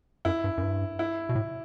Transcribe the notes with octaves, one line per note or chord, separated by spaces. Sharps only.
F#2 E4
G2
F#2
G2
E4
B2
A2